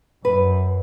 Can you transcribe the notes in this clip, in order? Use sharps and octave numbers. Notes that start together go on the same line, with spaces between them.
F#2 B4